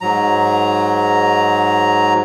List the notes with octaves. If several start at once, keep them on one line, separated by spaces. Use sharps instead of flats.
G#2 F#3 A#5